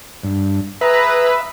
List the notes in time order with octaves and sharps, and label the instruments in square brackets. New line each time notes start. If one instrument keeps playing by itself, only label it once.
[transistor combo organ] G2
[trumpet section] G#4 A#5 [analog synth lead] B4 [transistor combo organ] E5